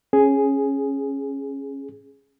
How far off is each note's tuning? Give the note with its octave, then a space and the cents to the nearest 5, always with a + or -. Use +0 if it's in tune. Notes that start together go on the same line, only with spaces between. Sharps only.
C#4 -15 G#4 +0